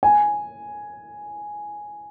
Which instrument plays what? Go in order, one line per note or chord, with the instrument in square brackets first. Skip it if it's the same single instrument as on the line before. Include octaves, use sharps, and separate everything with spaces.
[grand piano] G#5